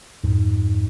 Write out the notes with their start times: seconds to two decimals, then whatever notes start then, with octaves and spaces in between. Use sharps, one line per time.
0.23 F2 G#2